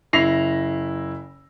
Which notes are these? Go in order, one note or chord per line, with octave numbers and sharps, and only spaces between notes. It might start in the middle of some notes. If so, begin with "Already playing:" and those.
F#1 E4 A#6 C7 F7